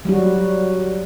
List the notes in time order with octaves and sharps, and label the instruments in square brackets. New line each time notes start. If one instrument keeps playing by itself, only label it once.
[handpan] F#3 G3 F#4